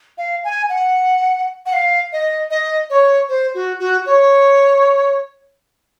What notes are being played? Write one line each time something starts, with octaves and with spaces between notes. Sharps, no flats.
F5
G#5
F#5
F#5
F5
D#5
D#5
C#5
C5
F#4
F#4
C#5